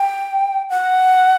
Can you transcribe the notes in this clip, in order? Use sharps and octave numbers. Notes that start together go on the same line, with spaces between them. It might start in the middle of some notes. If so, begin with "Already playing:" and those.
Already playing: G5
F#5